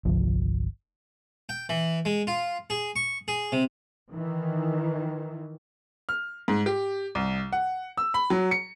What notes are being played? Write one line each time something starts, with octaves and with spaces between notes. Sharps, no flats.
G1 C2 F3
G5
E3
G#3
F4
G#4
C#6
G#4
C3
D#3 E3
F6
G#2
G4
C2
F#5
E6
B5
F#3
C#7